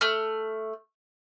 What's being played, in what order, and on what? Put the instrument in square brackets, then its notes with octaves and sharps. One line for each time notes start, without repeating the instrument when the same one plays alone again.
[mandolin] A3 F6